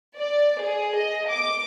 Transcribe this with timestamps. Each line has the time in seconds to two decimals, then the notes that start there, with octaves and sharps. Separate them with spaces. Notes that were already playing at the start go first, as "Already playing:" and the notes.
0.17 D5
0.61 G#4
0.98 D#5
1.29 D6